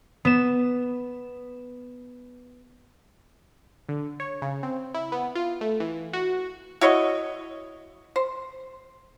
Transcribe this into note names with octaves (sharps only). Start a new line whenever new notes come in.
B3 E7
D3
C#5
C#3
C4
E4
B3
F4
A3
E3
F#4
E4 F#4 C#5 D#5
C5